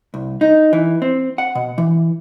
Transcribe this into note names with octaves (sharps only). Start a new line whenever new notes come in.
C2
D#4
E3
C4
F#5
B2
E3